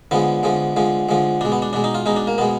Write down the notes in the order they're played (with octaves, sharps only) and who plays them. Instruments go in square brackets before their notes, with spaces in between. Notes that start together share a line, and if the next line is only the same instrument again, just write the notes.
[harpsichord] D3 F3 G#3 B3
D3 F3 G#3
D3 F3 G#3
D3 F3 G#3
B2 G#3 D4
B3
D4
B2 G#3 D4
D#4
F4
B2 G#3 D#4
D4
A#3
B2 G#3 B3